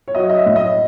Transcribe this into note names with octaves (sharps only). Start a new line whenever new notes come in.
C#5
F#3 D#5
D#5
E5
A2
D#5